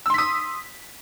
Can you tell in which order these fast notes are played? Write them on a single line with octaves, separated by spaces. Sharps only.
E6 C6 B6 D#6